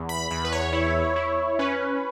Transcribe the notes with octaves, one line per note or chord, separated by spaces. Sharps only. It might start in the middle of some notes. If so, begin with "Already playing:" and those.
Already playing: E2
B5
E2 B5
B4
C#5
E4
E4
C#4 B4